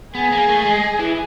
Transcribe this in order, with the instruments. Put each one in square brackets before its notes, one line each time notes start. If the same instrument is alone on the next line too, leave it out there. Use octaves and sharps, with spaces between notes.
[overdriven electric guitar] B3 [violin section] G#4
[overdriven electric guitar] A#3
A3
G#3
E3